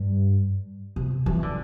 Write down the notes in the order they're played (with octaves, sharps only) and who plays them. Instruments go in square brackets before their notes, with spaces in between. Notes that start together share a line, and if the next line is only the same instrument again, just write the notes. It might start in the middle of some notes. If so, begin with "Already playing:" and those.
Already playing: [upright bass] G2
C3
E3
D3